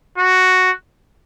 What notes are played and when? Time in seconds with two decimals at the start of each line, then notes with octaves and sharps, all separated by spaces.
0.18 F#4